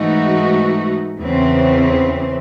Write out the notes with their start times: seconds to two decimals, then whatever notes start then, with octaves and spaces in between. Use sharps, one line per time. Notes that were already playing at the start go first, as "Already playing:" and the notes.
Already playing: G#2 E3 A3 D#4 F#4
1.19 E2 C#3 E3 C4